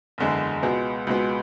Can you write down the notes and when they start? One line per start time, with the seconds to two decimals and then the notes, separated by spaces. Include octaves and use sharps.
0.18 F#1 E2 D3 G#3
0.63 C#2 B2 G#3 B3
1.07 C#2 B2 G#3 B3